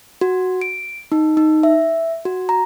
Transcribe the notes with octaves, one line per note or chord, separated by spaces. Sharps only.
F#4
D7
D#4
D#4
E5
F#4
A#5